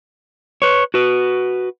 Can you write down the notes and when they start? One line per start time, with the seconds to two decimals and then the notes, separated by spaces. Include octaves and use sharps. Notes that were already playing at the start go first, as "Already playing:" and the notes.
0.62 B4 C#5
0.94 F#4 B4